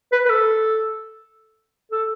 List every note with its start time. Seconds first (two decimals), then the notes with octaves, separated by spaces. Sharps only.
0.12 B4
0.25 B4
0.29 A4
1.92 A4